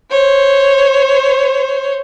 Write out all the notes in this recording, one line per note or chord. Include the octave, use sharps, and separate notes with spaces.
C5 C#5